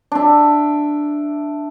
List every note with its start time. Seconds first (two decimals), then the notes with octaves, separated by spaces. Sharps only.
0.12 D4 E5